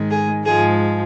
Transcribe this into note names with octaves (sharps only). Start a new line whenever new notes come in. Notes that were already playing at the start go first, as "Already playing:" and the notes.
Already playing: G#2 D#3 G#3
G#4
G#2 F3 G#3 G#4